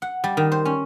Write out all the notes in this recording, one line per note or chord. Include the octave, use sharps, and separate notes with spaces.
F#5
G3
D#3
C5
C#4